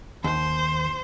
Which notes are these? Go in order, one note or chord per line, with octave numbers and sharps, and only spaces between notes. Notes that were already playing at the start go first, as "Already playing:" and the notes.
D#2 C5